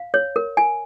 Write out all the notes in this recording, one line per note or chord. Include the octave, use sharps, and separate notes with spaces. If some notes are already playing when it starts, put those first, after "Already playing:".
Already playing: F5
C#5
A#4
G#5